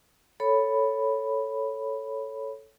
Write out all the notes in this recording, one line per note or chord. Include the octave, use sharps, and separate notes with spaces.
A4 C#5 B5